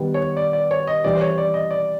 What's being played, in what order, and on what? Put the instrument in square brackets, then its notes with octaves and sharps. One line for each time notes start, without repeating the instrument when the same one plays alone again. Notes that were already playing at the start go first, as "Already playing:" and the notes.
Already playing: [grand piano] D#3 G3 B3
[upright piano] C#5
D5
D5
C#5
D#5
[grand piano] C3 E3 G3 [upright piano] D5
[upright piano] C5
C#5
D5
D#5
D5